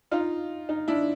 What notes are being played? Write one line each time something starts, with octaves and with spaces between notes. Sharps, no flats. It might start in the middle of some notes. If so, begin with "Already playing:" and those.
D#4 F4
D#4
D4 E4